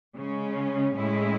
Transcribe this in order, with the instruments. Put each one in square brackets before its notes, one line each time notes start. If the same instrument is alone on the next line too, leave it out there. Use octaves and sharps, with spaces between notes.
[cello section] C#3 G#3 C#4
A2 G#3 C#4 E4